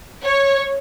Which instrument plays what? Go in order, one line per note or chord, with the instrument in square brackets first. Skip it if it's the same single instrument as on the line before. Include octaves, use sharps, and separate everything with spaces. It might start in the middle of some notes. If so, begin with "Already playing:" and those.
[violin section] C#5